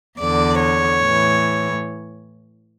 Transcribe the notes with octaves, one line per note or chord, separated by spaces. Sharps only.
E2 D3 D5
C#5
A2 E3